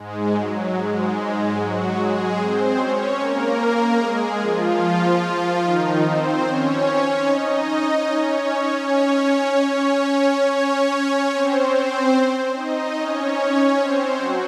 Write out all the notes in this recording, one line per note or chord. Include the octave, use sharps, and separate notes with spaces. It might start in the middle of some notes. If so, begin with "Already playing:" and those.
Already playing: G#2 G#3
F#3
G#2 G#3
F#3 F#4
G#3 G#4
C4 C5
C#4 C#5
A#3 A#4
G#3 G#4
F3 F4
D#3 D#4
C4 C5
C#4 C#5
D#4 D#5
C#4 C#5
C#4 C#5
C#4 C#5
C#4 C#5
C4 C5
C4 C5
D#4 D#5
C#4 C#5
C4 C5
F#3 F#4